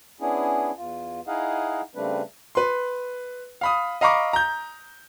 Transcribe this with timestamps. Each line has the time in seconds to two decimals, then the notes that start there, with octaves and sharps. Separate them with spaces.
0.21 B3 C#4 D4 E4 G#4
0.76 E2 F4
1.27 D#4 E4 G#4 D#5 F5 F#5
1.95 C#3 G3 A3 C4 D4 B4
2.55 B4 C6
3.61 F5 B5 D#6
4.01 D#5 F5 A#5 B5 C#6 D6
4.33 A#5 G6